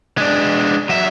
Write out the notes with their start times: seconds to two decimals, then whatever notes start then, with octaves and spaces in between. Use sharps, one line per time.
0.18 G#3 D4
0.89 F#3 E5